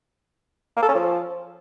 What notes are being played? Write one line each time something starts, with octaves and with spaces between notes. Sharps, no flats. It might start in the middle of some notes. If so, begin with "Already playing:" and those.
A#3
A4
C#4
F3